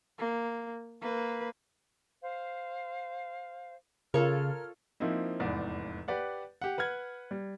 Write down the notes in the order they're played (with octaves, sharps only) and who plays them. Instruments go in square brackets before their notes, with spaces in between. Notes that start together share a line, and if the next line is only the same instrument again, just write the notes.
[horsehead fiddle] A#3
A#3 B4
[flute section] C5 F5
[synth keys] C#3 [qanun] F4 A4 C#5 [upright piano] A#4 [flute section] F6
[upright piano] F3 A#3 C4 D#4 E4
F1 E2 G#2 D5
G4 B4 D5 F#5
G4 F#5
B4 F#5 F6 G#6
G3